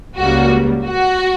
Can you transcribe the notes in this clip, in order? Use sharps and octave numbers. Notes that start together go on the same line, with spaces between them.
C#2 C#3 G3 A#3 F#4
F#4